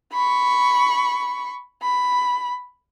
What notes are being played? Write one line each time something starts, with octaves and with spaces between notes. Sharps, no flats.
B5 C#6
B5